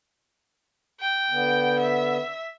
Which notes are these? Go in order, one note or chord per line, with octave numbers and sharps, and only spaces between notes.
G5
D3 B3
E5